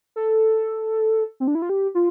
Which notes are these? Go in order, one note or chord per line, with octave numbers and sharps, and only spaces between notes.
A4
C4
D4
E4
F4
G4
F4